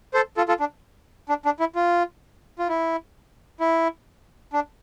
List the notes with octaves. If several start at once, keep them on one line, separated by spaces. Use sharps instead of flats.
A4 C5
F4 A4
F4 A4
D4
D4
D4
E4
F4
F4
E4
E4
D4